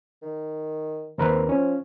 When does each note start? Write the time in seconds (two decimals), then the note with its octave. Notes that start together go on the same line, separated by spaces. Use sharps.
0.22 D#3
1.18 D#2 C4 A#4 B4
1.49 F3 C#4